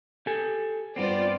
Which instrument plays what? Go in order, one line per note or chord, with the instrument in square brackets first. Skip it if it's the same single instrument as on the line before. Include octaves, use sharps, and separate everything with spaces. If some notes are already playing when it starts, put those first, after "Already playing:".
[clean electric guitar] G4 A4 G#5
[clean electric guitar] G2 B3 C4 [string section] F4 C5 D5